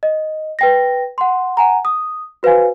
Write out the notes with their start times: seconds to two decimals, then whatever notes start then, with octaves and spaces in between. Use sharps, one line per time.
0.03 D#5
0.59 B4 G5 A#6
1.18 F#5 C6
1.57 F#5 G#5 A#5
1.85 D#6
2.43 F#4 B4 C5 F5 G#5